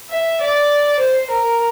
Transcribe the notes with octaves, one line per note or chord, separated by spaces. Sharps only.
E5
D5
C5
A#4